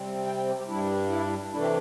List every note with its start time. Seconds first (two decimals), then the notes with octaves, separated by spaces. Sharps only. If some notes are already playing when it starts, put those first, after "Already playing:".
Already playing: C3 G3 C4
0.26 G5
0.37 G5
0.48 G4
0.58 G4
0.68 G2 G3 D4 E4
1.09 E4
1.52 C3 E3 A3 D4 E4
1.62 G4